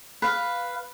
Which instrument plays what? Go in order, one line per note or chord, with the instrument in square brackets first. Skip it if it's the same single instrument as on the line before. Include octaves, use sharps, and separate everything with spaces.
[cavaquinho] B4 F5